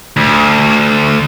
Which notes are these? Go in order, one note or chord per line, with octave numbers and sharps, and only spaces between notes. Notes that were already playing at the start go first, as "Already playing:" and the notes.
D2